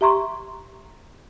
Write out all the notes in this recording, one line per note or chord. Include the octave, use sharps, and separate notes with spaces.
G4 E5 A#5 C6 C#6